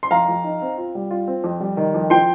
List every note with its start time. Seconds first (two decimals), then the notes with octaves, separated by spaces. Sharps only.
0.03 C6
0.11 F2 F5 A#5
0.29 F2
0.44 D#4
0.62 C4
0.78 F4
0.95 G3
1.11 F4
1.28 C4
1.44 F2
1.60 G3
1.77 D#3
1.94 F2
2.10 F3 G5 C6